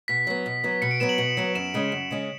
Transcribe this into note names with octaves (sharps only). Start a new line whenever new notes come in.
B2 B6
F#3 B3
B2
F#3 B3
B2 C#7
D7
F#3 B3 E7
F#7
B2
F#3 B3
F#2 E7
C#3 G#3 C#4
F#2
C#3 G#3 C#4